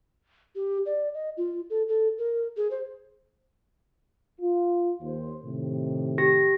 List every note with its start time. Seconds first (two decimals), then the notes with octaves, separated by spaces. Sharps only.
0.55 G4
0.86 D5
1.14 D#5
1.37 F4
1.70 A4
1.88 A4
2.18 A#4
2.57 G#4
2.71 C5
4.41 F4
5.02 D#2 C5
5.44 A2 C3 D#3
6.18 G4 A#6